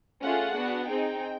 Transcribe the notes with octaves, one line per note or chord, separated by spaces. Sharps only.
A3 C#4 F4 G#4 F#5
B3 D4 F#4
C4 D#4 G#4 G5